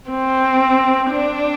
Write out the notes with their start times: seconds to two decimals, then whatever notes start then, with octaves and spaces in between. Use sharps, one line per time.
0.10 C4
1.11 D4